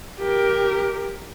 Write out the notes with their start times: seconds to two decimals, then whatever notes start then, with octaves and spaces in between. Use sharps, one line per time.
0.19 G4 A#4